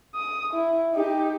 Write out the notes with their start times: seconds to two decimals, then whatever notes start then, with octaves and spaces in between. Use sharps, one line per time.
0.15 D#6
0.53 E4
0.94 D#4 G4